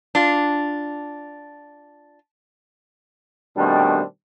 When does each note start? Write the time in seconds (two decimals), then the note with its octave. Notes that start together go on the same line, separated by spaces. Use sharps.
0.15 D4 F4
3.57 B2 D#3 G3 A3 C4 D4